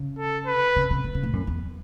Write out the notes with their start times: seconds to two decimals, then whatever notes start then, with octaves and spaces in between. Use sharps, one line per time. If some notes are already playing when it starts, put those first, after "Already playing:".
Already playing: C#3
0.19 A4
0.47 B4
0.76 C#3
0.90 C#3
1.04 D#3
1.15 C#3
1.23 A2
1.33 F#2
1.47 E2